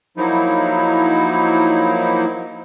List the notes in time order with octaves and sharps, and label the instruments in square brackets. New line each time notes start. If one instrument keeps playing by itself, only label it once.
[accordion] F3 F#3 A#3 D#4 E4